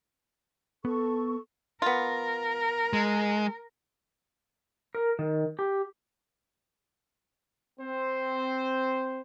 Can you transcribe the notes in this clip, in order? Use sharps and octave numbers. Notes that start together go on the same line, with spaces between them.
B3 A4 C#6
B3 F4 A#4
G#3
A#4
D#3
G4
C4 C5